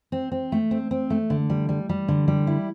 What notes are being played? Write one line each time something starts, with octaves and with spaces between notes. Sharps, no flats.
C4
C4
A3
C4
C4
A3
D3
G3
G3
G3
D3
G3
E4